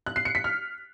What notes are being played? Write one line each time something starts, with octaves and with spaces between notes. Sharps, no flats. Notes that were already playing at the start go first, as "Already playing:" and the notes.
F#6
C7
C#7
B6
F6